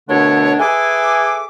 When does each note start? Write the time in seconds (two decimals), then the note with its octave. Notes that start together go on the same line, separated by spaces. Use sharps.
0.09 C2 B2 D3 A3 D4 C#5
0.59 E4 G#4 A4 B4 G#5 D6